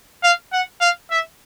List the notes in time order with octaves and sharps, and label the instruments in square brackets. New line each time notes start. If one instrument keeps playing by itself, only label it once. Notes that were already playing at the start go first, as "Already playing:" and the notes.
[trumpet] F5
F#5
F5
E5